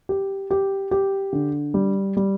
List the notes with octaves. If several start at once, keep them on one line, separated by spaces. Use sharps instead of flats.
G4
G4
G4
D3
G3
G3